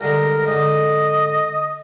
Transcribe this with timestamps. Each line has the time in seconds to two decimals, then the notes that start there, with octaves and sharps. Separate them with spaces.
0.01 C2 D3 G#3 A#4
0.47 G#2 D3 D#5